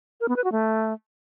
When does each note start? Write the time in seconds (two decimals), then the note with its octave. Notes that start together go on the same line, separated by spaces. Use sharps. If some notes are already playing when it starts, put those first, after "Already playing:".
0.21 A#4
0.28 B3
0.36 B4
0.44 F#4
0.52 A3